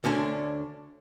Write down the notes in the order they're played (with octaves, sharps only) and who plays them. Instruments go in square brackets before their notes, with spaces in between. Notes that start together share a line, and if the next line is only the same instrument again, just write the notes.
[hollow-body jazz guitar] D2 D3 C#4 D4